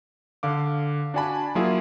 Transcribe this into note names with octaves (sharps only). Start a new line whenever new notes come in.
D3 F5 D6
D4 F#4 D5 G#5 A5 B5
F#3 A#3 E4 F4 G#4